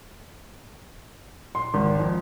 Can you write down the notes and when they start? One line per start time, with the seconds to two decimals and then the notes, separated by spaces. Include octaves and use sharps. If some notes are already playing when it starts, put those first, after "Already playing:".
1.55 C6
1.74 G#1
2.00 F2